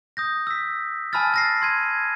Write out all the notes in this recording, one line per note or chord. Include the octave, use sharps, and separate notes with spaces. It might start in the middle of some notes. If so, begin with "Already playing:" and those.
D#6 G6 A#6
E6 B6
G#5 A5 B5 E6 F6 A6
A6 A#6 C7
C6 G#6 D#7